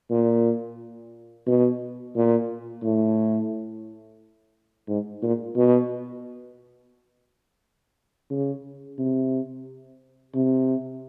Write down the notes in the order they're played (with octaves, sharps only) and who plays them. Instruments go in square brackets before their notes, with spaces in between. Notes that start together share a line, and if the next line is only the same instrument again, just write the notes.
[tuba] A#2
B2
A#2
A2
G#2
A#2
B2
C#3
C3
C3